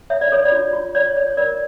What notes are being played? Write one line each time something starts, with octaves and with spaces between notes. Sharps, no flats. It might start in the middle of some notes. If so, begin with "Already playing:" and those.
C#5 E5
D5
A4 C#5
D5
F4
F4
C#5 D5
C#5
A#4 D5